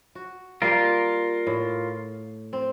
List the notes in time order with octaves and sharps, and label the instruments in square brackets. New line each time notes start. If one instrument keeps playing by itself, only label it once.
[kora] F#4
[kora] G3 A#3 G4 [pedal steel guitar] F4 A#4
[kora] A2
C4